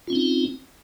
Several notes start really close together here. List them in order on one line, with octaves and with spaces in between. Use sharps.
F4 C#4 C4 D#4